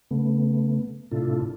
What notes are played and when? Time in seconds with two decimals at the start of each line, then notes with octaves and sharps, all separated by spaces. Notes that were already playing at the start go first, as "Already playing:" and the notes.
0.11 C#3 A3 B3
1.11 A2 C3 D4 E4 F4 A4